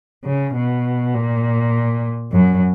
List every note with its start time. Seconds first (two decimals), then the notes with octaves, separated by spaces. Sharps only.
0.25 C#3
0.55 B2
1.14 A#2
2.32 F#2